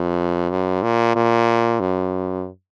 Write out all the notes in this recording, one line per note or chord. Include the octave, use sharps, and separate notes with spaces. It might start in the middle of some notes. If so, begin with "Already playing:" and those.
Already playing: F2
F#2
A#2
A#2
F#2